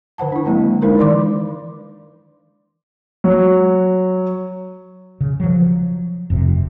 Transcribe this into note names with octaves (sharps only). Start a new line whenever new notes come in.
D3 C5 F#5 A5
D4 E4
F#3 G#3 A#3 C4 E4
D3
G#3 D4 D#4 A#4 C5
D#3 E3 D5 C6 D6
F#3
C#3
F3 F#3
F1 F#2 C3